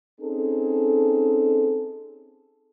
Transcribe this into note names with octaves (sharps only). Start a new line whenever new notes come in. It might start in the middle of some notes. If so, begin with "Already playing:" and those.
C4 C#4 D#4 G#4 A4